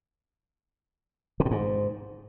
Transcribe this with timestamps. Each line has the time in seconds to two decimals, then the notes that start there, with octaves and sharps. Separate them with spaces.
1.40 C3
1.45 A2
1.51 G#2